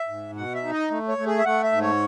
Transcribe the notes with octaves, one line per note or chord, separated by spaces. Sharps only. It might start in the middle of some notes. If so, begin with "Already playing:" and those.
Already playing: E5
G#2
B2 F#5
E5
D#4
D#5
A3
C#5
A3
G#4
E5
A3 F#5
E5
G#2
C#5